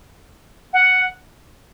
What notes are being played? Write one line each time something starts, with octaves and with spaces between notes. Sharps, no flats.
F#5